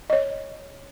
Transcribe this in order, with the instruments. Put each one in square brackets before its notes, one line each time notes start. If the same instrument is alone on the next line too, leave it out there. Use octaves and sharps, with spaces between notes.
[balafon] C#5 D#5